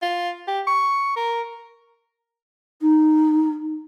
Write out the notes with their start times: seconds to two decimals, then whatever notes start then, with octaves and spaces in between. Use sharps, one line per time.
0.02 F4
0.48 G4
0.67 C#6
1.16 A#4
2.81 D#4